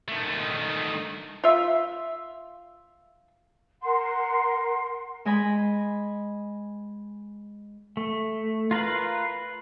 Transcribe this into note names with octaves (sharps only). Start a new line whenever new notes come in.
D#3 A3
F4 E5
A#4 F#5 C6
G#3 D#5 G#5 B5
A3
F4 A#4 B4 F5